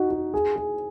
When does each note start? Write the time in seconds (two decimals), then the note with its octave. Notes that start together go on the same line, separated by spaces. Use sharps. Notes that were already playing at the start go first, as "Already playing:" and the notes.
Already playing: D#4 F#4
0.10 F#4
0.34 G#4
0.56 G#4